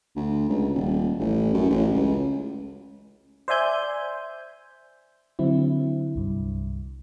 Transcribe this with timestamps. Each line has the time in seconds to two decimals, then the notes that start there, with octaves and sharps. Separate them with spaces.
0.16 D2
0.49 C#2
0.75 D#1
1.19 A1
1.54 F#2
1.70 A1
1.93 C#2
3.48 C5 D5 E5 G#5 G6
5.39 D3 F#3 C4 E4
6.15 C2 G2